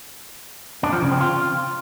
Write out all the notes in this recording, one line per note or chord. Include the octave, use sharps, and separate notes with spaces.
D4
F3
C#3
C4
F4